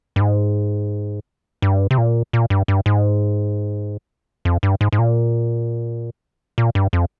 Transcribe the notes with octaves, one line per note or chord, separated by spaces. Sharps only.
G2
G#2
G2
C3
A#2
A#2
G2
G2
G#2
F2
G2
G#2
G#2
A#2
A#2
G2
F2